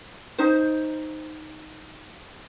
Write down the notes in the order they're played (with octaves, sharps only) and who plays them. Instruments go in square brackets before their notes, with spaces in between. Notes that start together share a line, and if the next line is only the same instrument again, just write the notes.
[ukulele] D#4 C5